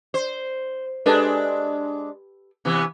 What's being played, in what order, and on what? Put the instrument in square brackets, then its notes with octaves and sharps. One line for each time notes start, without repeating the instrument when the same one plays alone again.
[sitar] C5
[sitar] G#3 D4 [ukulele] G4 A4 B4
[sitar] C3 E3 B3